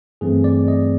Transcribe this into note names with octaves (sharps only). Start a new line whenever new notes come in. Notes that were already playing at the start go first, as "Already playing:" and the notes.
G2 E3 A3 C4 G#4
D5
D#5